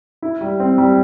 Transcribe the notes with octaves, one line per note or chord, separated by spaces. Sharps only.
E4
G3
C4
G3